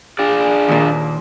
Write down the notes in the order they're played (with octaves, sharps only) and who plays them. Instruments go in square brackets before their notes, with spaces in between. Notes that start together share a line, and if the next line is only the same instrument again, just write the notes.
[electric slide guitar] D4 F4 D5 [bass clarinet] G#4
[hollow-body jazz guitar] D#2 A#2